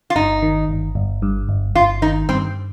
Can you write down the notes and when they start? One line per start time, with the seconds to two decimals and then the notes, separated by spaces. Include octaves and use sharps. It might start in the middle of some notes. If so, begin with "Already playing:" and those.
0.10 F4
0.16 G1 D#4
0.42 D#3
0.69 G1
0.95 G1
1.22 G2
1.49 G1
1.75 G1 F4
2.02 D#3 D#4
2.29 G2 C4